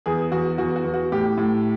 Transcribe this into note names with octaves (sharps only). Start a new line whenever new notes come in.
E2 G#4
E2 F#4
E2 F#4
F#4
E2
F#4
A2 G4
A2